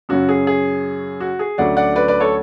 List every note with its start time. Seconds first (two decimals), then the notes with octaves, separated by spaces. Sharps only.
0.09 F#2 C#3 F#3 C#4 F#4
0.29 G#4
0.47 G#4
1.20 F#4
1.39 G#4
1.58 D2 D3 F#3 A3 C#4 D5 F#5
1.77 D5 F#5
1.96 B4 D5
2.08 B4 D5
2.20 A4 C#5